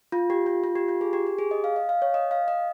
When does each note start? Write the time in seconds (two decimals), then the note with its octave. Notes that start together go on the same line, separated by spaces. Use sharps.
0.12 F4
0.30 G4
0.46 F4
0.64 F4
0.75 G4
0.88 F4
1.01 G#4
1.13 G4
1.27 G4
1.38 G#4
1.51 D#5
1.64 F5
1.76 D#5
1.89 F5
2.02 C#5
2.14 D#5
2.31 F5
2.48 D#5